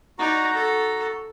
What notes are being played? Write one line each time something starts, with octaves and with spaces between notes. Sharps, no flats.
D#4 F#4 D5 A#5
A4